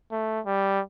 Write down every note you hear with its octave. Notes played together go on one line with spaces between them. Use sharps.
A3
G3